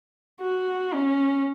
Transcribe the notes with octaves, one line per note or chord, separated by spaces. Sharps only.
F#4
C#4